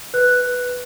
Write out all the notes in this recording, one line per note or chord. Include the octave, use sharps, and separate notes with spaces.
B4 F#6